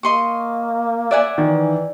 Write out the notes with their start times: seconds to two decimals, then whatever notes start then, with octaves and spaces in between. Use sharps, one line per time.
0.03 A#3 D#5 C6 C#6
1.11 D5 E5 F#5 G#5
1.38 D#3 E3